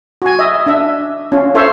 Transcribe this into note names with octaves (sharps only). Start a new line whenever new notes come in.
F#4 G#5
D#5 E5
D4 E5
C#4 F4
F4 A4 C5 C#5 E5 F5